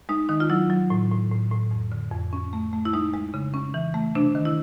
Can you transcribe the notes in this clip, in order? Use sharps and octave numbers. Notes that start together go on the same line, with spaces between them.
G#3 D#4
D#3 D#4
F4
F#3 E4
F#3
A2
A2
A2
A2
F2
D3
F2
C#4
A3
A3
E4
G#3 D#4
G#3
C#3
C#4
E3
A3
C3 D4
D#3
E4